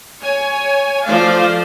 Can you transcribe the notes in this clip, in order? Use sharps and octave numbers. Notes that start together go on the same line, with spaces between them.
C#5 G#5
F3 A3 C5 D5 F5